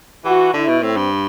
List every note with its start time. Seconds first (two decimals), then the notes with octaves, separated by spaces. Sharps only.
0.25 E3 F#4
0.54 D3 E4
0.68 B2
0.82 A2 C4
0.96 G2